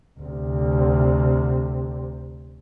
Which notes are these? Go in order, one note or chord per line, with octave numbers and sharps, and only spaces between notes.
D2 C3